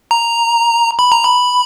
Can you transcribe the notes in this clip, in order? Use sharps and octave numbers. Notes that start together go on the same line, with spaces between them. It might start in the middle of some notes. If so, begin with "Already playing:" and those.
A#5
B5
A#5
B5